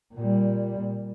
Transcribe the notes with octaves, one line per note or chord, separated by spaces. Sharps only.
A#2 G3